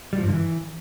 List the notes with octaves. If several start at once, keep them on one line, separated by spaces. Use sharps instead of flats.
G3
F3
G2
D3
E3